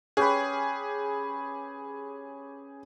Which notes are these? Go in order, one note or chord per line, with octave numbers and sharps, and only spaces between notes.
C#4 G4 G#4 B4